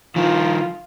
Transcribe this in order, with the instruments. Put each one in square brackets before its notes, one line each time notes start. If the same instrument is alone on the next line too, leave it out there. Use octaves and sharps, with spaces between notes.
[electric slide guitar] D#3 F3 [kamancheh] F4